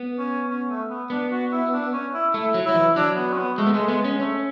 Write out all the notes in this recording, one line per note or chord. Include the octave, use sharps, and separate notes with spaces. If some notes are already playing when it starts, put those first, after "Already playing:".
Already playing: B3
C#4
C#4
A3
B3
B3 D4
F#4
E4
D4
C#4
E4
A3 E4
F#3
F#3 E4
E3
F#3 D4
B3
C#4
B3
G#3 A3
B3
G#3 A3
G#3 B3
G#3 C#4
A3 C#4